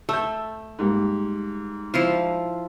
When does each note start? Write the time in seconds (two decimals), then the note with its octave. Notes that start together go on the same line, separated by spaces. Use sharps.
0.09 A3 E6 G6
0.79 G#2 G3 A#3
1.94 F3 E4 F4